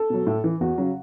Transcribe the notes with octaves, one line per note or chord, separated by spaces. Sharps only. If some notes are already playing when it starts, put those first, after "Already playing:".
Already playing: A4
B2 F#3
A2
E3
E2 F#4
C#3 F#3